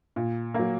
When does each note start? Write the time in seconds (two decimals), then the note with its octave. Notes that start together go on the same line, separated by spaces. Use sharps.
0.16 A#2
0.54 F#3 A#3